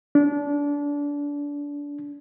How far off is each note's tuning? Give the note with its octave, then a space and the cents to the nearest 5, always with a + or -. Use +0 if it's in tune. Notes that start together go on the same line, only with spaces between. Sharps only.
D4 -25